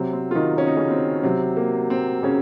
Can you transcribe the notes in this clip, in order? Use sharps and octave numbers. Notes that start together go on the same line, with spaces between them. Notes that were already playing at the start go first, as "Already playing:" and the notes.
Already playing: C3 F#3 C4
C4
F4
D#3 D#4
C#4
D#4
C#3 C#4
C4
C3 F#3 C4
A#3
C4
C#3 C#4